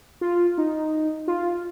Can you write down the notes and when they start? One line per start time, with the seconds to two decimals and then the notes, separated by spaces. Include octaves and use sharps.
0.21 F4
0.58 D#4
1.28 F4